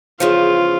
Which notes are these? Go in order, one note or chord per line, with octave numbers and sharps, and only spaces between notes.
E2 C#3 F3 F4